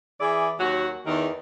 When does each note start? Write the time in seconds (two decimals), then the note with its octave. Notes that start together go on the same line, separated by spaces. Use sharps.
0.20 E3 E4 G#4 D5
0.59 D#2 F#3 F#4
1.07 E2 D#3